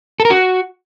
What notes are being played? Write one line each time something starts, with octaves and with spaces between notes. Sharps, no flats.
A4
A#4
F#4